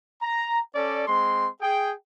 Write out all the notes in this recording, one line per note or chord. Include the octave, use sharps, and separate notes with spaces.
A#5
C#4 A4 D5
G#3 C4 C6
G#4 G5